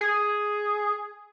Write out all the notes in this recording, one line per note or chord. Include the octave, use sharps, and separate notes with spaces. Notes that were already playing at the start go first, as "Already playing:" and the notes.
G#4